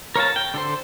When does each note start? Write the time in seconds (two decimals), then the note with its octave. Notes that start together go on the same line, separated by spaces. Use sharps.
0.16 A#4 C#5 F5 A5
0.36 G5
0.54 D3 A4 C5